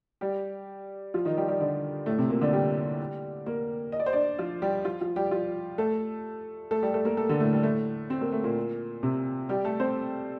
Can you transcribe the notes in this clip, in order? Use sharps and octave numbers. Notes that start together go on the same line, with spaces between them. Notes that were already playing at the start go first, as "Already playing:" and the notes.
G3 G4
F3 F4
D#3 D#4
G3 G4
G3 G4
D3 D4
A2 A3
C3 C4
A#2 A#3
D3 D4
G3 G4
A#3 A#4
D#5
D5
C5
D4 D5
F3 F4
G3 G4
F3 F4
F3 F4
G3 G4
F3 F4
A3 A4
A3 A4
G3 G4
A3 A4
A#3 A#4
A3 A4
D3 D4
A2 A3
G3
A2 A3
C4
A#3
A3
A#2 A#3
C3 C4
G3 G4
A3 A4
C4 C5